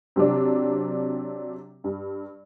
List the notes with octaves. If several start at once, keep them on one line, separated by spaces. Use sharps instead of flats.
C3 F#3 C4 D4
G2